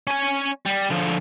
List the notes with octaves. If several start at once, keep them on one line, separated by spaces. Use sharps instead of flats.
C#4 G#5
G3
D3 F3